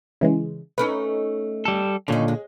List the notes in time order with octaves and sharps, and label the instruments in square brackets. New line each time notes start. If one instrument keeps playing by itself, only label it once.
[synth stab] C#3 E3 G#3
[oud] A3 C#4 D#4 [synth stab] B4
[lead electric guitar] G3 A4
[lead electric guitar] A#2 D3 [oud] D#3 C#4
[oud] G#3